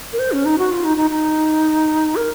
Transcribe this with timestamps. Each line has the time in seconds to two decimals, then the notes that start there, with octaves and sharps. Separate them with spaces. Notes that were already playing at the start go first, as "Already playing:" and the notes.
0.13 A#4
0.19 C5
0.32 C#4
0.45 D#4
0.58 F#4
0.71 F4
0.84 D#4
0.97 D#4
1.11 D#4
2.16 A#4